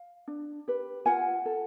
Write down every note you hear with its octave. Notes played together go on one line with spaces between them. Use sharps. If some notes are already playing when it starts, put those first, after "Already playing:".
Already playing: F5
D4
G4 B4
F4 F#5 G#5
A4